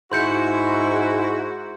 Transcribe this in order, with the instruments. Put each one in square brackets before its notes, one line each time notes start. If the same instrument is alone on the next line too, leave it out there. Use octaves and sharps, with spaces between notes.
[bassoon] G#2 [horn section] E4 F#4 [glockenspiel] C6 G6 C#7